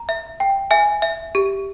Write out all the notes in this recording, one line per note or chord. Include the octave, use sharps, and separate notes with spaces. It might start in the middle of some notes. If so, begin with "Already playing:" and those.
Already playing: A#5
E5
G5
E5 G#5
E5
G4